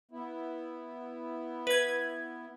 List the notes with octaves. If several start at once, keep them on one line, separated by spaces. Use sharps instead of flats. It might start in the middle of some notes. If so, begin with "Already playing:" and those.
B3 E4
B4 G#6